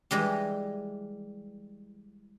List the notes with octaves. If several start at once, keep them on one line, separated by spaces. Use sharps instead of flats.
E3 G3 G#3 G4